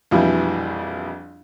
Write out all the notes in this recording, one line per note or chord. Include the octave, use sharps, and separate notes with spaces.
A#1 F2 B2 E3 G3 E4